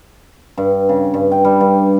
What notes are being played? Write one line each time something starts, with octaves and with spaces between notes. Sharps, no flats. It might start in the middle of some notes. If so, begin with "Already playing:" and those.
G2
C#3
G2
G5
G3
G2